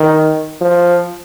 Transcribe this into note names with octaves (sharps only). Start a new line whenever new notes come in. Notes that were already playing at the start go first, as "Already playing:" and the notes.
Already playing: D#3
F3